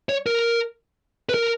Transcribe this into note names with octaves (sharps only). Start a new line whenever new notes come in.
C#5
A#4
B4
A#4